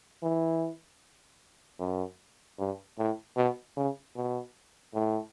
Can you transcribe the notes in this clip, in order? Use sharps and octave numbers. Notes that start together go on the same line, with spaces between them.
E3
F#2
G2
A2
B2
C#3
B2
A2